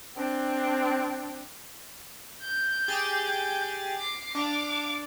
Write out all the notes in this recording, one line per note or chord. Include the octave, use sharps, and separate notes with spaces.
C4 D4
G6
G4 G#4 A6
D6 C7
D4 F5 D6